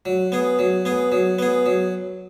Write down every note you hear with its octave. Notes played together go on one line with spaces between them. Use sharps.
F#3
B3 G#4
F#3
B3 G#4
F#3
B3 G#4
F#3